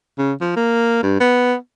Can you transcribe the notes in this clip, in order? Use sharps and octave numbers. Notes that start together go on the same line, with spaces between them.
C#3
F3
A#3
G2
B3